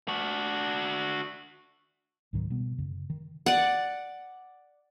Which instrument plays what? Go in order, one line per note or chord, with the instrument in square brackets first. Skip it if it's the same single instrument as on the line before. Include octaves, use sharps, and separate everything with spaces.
[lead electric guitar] D4 F#4
[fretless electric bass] C#2 G#2 D#3 F#3
B2 G3 B3
F#2 C#3
D#3
[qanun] D5 F#5